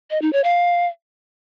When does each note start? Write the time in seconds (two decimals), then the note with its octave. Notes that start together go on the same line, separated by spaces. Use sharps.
0.11 D#5
0.22 D#4
0.33 C#5
0.44 F5